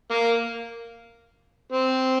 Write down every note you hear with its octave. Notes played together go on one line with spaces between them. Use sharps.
A#3
C4